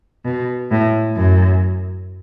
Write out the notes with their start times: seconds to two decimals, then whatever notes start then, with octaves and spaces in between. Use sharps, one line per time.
0.25 B2
0.71 A2
1.16 F#2